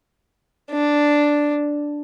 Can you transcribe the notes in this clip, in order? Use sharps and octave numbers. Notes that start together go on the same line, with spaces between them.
D4